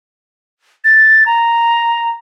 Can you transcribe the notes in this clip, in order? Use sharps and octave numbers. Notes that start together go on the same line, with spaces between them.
A6
A#5